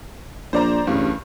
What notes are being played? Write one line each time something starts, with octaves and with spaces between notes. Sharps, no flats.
A#1 C5 D5 A#5
A1 G2 C#3